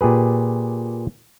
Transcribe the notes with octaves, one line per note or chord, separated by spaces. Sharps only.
A#2 G4 G#4 B4